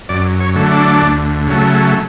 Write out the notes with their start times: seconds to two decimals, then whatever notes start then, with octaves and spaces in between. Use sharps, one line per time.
0.09 F#2 D5
0.40 C#5
0.56 D3 F#3 A3
0.71 D4
1.02 D2
1.48 C#3 F#3 A3